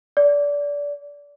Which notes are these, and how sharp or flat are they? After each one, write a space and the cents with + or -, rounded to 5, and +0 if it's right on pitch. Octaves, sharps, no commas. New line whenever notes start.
D5 -25